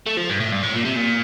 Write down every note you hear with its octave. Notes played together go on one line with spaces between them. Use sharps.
A3
F3
G2
A2
G2
A2
A#2
C3
A#2